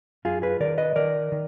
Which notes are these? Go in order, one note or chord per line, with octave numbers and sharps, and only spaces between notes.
F#2 F4 G#4
G#4 B4
D#3 A#4 D5
B4 D#5
D#3 A#4 D5
D#3